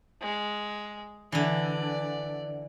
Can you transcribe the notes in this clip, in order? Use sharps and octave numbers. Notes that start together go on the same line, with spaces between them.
G#3
D3 E3 D5